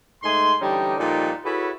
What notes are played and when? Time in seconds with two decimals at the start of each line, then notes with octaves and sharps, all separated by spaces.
0.23 G#2 A3 D#4 G#5 C6
0.61 D3 E3 G3 C#4 D#4
0.98 A#2 F3 G3 D#4 A4 D5
1.45 E4 F#4 G#4 A4 B4 C#5